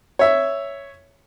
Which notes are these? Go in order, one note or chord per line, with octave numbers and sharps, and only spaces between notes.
C#5 E5